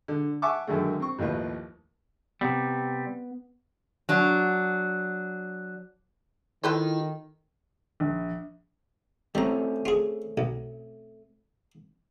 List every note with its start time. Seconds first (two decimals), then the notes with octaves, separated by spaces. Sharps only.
0.08 D3
0.42 E5 F#5 G#5 A5 C#6 D6
0.67 F#2 D3 D#3 G#3 A3
1.00 C4 C#6
1.19 A1 D#2 F3 F4 B4
2.41 C3 G3 B3
4.09 F#3 D4
6.64 D#3 E4 F4 A4 B4 C5
8.00 A#1
9.35 G3 A3 C4 C#4 A#5
9.85 F4 G#4
10.38 B1